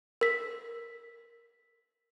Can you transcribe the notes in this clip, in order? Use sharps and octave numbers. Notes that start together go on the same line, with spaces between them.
A#4 B6